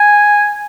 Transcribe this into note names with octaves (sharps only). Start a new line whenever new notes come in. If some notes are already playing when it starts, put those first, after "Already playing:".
Already playing: G#5